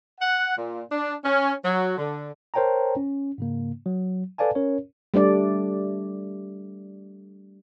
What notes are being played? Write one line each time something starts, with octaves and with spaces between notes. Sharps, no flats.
F#5
A#2
D4
C#4
F#3
D3
A#4 C5 C#5 G5 A5 A#5
C#4
G#2 C#3 A#3
F#3
A4 B4 D5 F5 G#5 A5
C#4 A#4 C#5
G3 A3 D4 D5